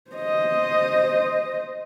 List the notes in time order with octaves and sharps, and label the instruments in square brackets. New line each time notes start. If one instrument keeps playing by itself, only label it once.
[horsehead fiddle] C5 D#5